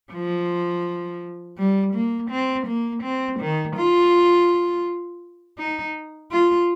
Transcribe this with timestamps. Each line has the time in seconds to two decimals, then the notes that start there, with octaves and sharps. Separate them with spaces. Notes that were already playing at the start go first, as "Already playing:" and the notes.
0.12 F3
1.58 G3
1.94 A#3
2.31 C4
2.67 A#3
3.04 C4
3.40 D#3
3.77 F4
5.58 D#4
6.32 F4